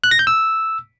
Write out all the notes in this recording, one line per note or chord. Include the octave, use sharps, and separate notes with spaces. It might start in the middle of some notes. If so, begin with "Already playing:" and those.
F#6
A#6
G6
E6